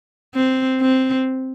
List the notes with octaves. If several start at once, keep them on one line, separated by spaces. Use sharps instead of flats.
C4
C4